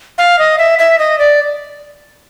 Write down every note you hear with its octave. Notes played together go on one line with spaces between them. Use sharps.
F5
D#5
E5
E5
D#5
D5